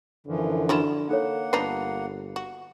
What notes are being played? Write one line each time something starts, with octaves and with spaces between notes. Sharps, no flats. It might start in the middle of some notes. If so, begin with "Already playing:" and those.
F#2 D3 E3 F3
F#3 D4 E4 F4 B5 E7
A#3 D#4 A4 C#5 F#5
G1 B3 D4 D#4 C7
F#4